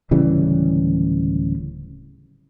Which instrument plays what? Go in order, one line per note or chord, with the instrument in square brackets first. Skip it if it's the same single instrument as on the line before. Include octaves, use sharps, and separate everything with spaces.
[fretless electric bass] D1 C#3 E3 G3